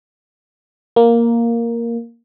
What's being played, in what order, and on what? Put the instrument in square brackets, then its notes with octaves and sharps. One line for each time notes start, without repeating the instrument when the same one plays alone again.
[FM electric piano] A#3